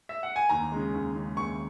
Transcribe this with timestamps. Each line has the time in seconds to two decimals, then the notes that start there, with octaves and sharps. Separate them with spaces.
0.09 E5
0.23 F#5
0.36 G#5
0.49 D#2 A#5
0.72 C#3 G#3
0.94 D#2
1.16 C#3 G#3
1.37 D#2 C#6